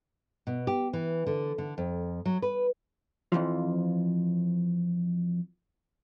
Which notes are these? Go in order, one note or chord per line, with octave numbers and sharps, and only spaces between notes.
B2
G4
E3
D3
D3
F2
F#3
B4
F2 A#2 E3 F3